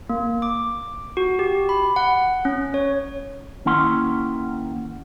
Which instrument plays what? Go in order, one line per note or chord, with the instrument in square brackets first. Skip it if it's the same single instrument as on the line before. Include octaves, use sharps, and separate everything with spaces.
[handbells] A#3
D6
F#4
G4
B5
F#5
C#4
C#5
[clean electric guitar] D#3 A#3 C#4 E4 F#5 C6